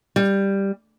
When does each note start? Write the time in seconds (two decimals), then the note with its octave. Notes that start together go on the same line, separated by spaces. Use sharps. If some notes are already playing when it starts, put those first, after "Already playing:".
0.16 G3